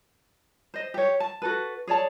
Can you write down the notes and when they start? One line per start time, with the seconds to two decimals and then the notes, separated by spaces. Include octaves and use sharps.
0.74 C5 D#5
0.94 G4 C#5
1.20 A5
1.42 F#4 A4 B4
1.87 G#4 C#5 D5 A5